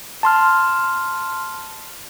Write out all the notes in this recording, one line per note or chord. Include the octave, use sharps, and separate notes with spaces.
A5 C6 F6